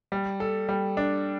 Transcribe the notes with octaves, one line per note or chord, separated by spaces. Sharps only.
G3
A4
G3
D4